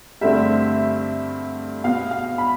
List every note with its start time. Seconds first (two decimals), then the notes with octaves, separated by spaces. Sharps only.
0.21 G2 D3 A3 C4 E5
1.84 B2 B3 F5
2.11 F5
2.38 B5